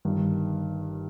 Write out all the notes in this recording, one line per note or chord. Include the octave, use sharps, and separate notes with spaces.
G1 G2 D#3